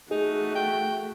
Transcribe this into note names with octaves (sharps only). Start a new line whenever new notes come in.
A3 D#4 F#4 G#4
G5